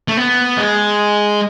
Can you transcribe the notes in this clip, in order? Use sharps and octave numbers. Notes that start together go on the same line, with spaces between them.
A3
B3
G#3